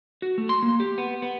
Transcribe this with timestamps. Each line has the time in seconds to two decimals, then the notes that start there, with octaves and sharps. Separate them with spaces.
0.22 F#4
0.38 A3
0.49 C6
0.62 A#3
0.80 G4
0.98 B3
1.22 B3